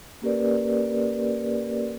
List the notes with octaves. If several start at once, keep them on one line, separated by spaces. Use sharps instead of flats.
A#3 C#4 G4 A#4 B4 D5